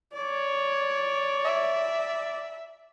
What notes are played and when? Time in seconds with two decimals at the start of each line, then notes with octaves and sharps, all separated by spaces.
0.14 C#5 D5
1.45 E5